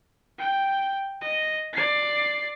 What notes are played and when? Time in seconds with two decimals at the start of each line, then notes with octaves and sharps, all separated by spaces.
0.38 G5
1.21 D#5
1.73 D5 C7